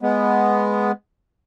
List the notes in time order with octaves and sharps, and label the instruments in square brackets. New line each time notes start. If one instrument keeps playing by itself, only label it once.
[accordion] G#3 B3